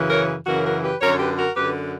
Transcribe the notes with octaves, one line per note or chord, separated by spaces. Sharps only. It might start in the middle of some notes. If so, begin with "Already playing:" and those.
Already playing: F#2 C#3 E3
A#4 C#5
F#2 C#3 E3 F#4 A#4
F#4 A#4
G4 B4
F#2 D3 A#4 C#5
G4 B4
F#4 A#4
F#2 D3 G4 B4